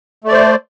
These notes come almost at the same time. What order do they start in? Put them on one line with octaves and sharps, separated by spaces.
A3 D5 C5